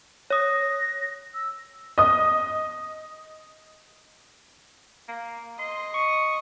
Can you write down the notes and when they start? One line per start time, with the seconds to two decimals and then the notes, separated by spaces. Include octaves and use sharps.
0.30 C#5 D#6 A#6
1.34 E6
1.98 D#5 D#6
5.08 A#3
5.59 D#5 C6
5.94 C#6